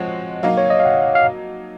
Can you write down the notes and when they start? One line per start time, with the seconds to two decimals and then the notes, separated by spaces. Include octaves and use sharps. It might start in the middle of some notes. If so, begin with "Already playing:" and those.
Already playing: F3 G#3 C4 F#4 C#5 F#5
0.43 F#3 A#3 D#4 F5
0.58 C#5
0.70 D#5
0.80 F5
0.85 F#5
1.15 F5